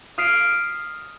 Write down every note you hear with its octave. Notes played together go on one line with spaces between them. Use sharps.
D#6 F6 B6 C7 D7 E7